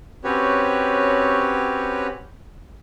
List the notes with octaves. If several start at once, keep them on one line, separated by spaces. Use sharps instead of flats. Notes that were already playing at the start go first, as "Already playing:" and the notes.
C4 C#4 F#4 G4 B4 C#5